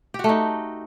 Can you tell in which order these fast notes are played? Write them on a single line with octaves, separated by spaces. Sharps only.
G4 F#4 A3 D#4